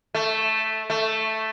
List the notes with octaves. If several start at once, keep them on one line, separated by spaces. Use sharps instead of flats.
A3
A3